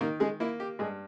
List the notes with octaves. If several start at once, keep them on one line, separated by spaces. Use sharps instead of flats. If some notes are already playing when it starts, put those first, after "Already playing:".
D#3 A#3 A#4
G#3 G#4
A#3 E4
G4
G2 G#3 G#4